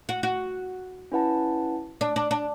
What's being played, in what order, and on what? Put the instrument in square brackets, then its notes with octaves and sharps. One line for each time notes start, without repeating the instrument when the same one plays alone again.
[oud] F#4
F#4
[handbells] C#4 E4 B4 F#5 A5
[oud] D4
D4
D4